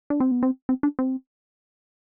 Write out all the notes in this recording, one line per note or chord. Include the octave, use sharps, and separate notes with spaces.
D4
C4
B3
C4
C4
D4
C4